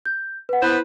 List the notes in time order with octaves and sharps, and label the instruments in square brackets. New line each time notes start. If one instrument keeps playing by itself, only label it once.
[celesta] G6
B4 F#5
[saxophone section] B3 B4 C5 [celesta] E4